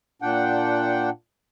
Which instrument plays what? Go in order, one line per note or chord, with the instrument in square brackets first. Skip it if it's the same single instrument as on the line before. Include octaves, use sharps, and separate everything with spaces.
[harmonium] A#2 D4 F#5 G5